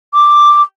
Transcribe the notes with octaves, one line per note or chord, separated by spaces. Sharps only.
D6